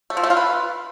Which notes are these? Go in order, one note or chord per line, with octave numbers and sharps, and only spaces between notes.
A3
F3
A3
F4
B4